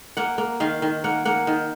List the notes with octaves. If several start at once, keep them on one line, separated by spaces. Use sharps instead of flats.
A#3 F#5
A#3
D#3 F5
D#3
A#3 F#5
A#3 F#5
D#3